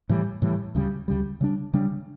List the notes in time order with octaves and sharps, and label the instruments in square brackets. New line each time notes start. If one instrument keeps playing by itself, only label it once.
[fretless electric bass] A2 E3 G3
A2 E3 G3
D2 C#3 G3
D2 C#3 G3
C#3 G3 D4
C#3 G3 D4